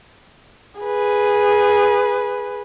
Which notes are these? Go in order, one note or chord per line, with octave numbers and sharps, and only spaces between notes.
G#4 B4